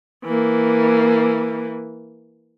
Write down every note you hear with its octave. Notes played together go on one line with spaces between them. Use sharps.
E3 A#3